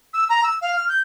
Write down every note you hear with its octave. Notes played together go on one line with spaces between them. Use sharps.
E6
A#5
E6
F5
F6
G6